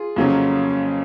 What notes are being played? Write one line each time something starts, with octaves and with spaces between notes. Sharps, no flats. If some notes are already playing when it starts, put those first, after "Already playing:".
Already playing: F4 G#4
F2 C#3 F#3 A#3 C#4